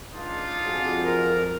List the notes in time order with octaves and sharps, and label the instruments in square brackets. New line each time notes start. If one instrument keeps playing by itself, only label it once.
[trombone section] C#2 [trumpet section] D4 D#4 F4
[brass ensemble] F2 [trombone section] F#4 G#4
[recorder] A#4